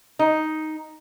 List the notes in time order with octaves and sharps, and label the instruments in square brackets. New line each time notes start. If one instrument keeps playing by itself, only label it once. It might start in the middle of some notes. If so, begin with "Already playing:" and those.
[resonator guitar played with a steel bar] D#4